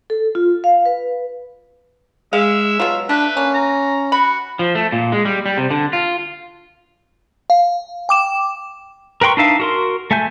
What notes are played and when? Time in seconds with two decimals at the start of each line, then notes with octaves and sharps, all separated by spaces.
0.10 A4
0.35 F4
0.64 F5
0.85 B4
2.33 G#3 E5 F5
2.80 B2 F#3 F4
3.09 A3 D4 B4
3.37 A#3 C#4
3.54 A#5
4.12 F#4 B5
4.59 F3
4.75 A3
4.92 A#2
5.12 G#3
5.25 G3
5.46 G3
5.58 C3
5.71 D3
5.93 F4
7.50 F5
8.09 G5 D6 E7
9.21 A#4 B4 G5 C6 C#6
9.37 D4 D#4 E5 F5
9.60 F#4 A#4 C6
10.11 A3 E5 G#5 G6